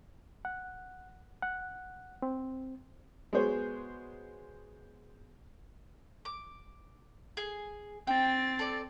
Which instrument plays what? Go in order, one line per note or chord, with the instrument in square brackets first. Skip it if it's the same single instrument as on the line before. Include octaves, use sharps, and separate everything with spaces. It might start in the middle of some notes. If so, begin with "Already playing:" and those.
[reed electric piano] F#5
F#5
C4
[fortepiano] G#3 B3 F#4 G#4 C5 C#5
[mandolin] D6
G#4
[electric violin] C4 A6 [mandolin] G5
[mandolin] A4 D5